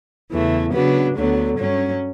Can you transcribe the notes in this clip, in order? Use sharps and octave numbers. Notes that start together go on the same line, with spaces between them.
E2 C#3 E3 A3
C#3 F#3 B3 D4
D2 D3 F#3 B3
G2 F#3 C#4